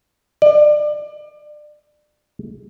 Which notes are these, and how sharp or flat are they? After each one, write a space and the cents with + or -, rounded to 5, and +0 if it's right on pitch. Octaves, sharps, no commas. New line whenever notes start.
D5 +30